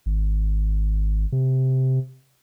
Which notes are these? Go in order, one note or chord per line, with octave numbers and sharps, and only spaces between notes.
G#1
C3